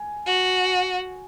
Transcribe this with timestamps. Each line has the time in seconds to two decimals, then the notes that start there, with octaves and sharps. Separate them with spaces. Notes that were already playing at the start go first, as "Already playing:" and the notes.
Already playing: G#5
0.27 F#4